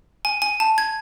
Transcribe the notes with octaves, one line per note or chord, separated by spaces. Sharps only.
G#5
G#5
A5
G#6